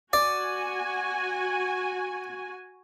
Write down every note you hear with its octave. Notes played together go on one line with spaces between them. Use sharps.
F#4 D5 G#5